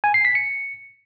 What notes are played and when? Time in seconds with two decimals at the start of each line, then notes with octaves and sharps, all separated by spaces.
0.04 G#5
0.14 C7
0.25 B6
0.35 C#7